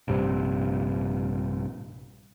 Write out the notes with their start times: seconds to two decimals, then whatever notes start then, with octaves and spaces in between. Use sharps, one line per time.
0.08 A#1 G2 C3